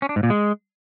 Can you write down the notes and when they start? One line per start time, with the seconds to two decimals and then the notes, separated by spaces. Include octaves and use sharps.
0.02 C#4
0.09 D4
0.16 G#2
0.23 A#2
0.30 G#3